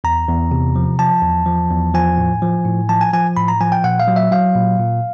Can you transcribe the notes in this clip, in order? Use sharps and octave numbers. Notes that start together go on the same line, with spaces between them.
E2 A#5
E2
C3
F3
F3 A5
E2
F3
E2
F3 G#5
A2
F3
A2
F3 A5
G#5
F3 G#5
A2 B5
A#5
F3 G#5
G5
A#2 F#5
F5
F#3
E5
F#3 F5
A#2
A#2